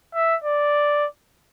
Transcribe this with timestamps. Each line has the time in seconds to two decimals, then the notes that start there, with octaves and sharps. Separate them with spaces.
0.15 E5
0.44 D5